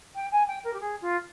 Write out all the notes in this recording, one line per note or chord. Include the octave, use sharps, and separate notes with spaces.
G5
G#5
G5
A#4
G4
G#4
F4